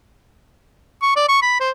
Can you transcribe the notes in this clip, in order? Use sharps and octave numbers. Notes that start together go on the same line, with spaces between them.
C#6
D5
C#6
B5
C5